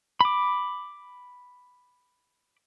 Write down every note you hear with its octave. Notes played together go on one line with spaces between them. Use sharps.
B5 D6